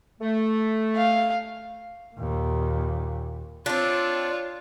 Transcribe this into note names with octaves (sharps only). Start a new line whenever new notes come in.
A3
F5
D#2 A#2
C4 D4 F4 C#5